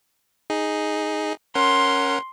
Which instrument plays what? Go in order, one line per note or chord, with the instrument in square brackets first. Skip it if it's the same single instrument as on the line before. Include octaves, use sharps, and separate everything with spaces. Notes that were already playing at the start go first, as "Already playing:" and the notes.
[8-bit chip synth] D#4 G#4
[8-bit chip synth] C#4 A#4 F#5 [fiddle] C6